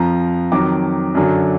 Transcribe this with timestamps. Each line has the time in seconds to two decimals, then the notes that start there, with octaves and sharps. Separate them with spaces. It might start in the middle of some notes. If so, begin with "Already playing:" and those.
Already playing: F2 F3 A#5
0.52 F2 D#3 F#3 D6
1.15 F#2 D3 F#3